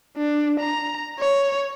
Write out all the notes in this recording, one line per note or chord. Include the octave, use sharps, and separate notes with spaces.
D4
A#5
C#5